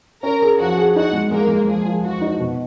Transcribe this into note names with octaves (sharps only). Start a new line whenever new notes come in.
C#4 A#4 A#5
G#4
F3 F#4 F#5
G#4
D#4 F#4 F#5
G#3
G#3 A#3 A#4
G#3
F3 G#4
F3
F3 F#4
D#4
B2